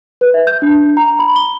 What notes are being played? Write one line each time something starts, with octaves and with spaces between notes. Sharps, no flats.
B4
E5
G6
D4
A#5
B5
G7